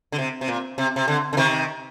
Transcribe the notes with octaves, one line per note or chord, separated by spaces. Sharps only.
D3
C3
C3
A#2
C3
C3
D3
D3
C3 D#3